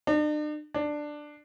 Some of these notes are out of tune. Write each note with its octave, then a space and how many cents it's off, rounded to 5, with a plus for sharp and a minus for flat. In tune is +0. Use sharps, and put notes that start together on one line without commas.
D4 +45
D4 +10